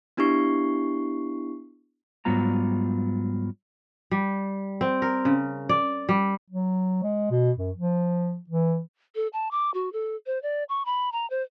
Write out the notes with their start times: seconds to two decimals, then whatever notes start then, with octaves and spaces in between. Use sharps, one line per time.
0.17 B3 D4 E4 G4 C#6 C7
2.25 G#2 F#3 G3 B3 F4 A#5
4.11 G3
4.81 C4
5.02 A#4
5.25 C#3
5.69 D5
6.09 G3
6.50 F#3
7.03 G#3
7.31 B2
7.58 F#2
7.77 F3
8.50 E3
9.15 A4
9.33 A5
9.51 D6
9.74 F#4
9.93 A4
10.26 C5
10.42 D5
10.69 C#6
10.86 B5
11.12 A#5
11.30 C5